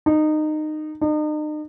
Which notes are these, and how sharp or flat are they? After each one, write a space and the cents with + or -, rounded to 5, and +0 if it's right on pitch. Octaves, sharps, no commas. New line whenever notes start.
D#4 -20
D#4 -40